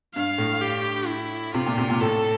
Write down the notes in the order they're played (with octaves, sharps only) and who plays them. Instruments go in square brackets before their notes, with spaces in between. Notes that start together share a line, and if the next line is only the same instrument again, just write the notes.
[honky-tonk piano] G2 [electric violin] F5
[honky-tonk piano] A2
[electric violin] G4
E4
[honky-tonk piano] C3 [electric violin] F4
[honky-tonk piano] A#2
C3
A#2
[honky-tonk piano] A2 [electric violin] A4